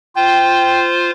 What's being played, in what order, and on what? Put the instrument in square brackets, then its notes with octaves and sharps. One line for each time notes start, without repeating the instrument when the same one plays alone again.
[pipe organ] F4 C5 [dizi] G5